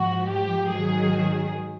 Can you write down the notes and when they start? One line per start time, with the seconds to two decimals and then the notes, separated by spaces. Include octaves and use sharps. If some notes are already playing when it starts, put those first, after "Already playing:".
Already playing: G#2 F3 F#4
0.28 G4
0.69 G#2 D#3 F#3 G#4